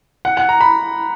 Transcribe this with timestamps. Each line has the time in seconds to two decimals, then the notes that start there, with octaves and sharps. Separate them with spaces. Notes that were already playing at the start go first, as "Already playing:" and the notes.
0.25 F#5
0.37 F#5
0.49 A#5
0.61 B5